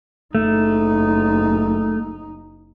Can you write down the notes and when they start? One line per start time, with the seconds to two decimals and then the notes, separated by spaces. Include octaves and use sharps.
0.35 F#1 A3 D#4